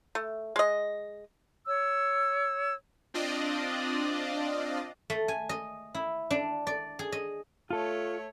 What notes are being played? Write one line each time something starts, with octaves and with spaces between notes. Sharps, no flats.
A3
G#3 D#5
C#5 E6
C4 D4 F4 D5 D#5
A3
G#5
D#5
E4
D4
D5
G#4
D#5
A3 F4 A4 C#5